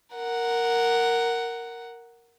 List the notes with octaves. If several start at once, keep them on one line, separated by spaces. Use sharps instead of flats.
A#4 F#5